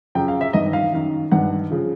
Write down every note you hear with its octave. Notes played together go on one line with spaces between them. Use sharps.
F#2 C#3 F3 G5
F5
E5
G2 D#3 D#5
F5
F#2 D#3
G2 D#3 F#5
C#3 F3